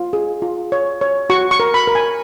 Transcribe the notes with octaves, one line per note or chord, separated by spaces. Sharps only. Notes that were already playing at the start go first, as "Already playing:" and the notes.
Already playing: F4
G#4
F4
C#5
C#5
F#4 C#6
C#6
A#4
B5
A#4
G#5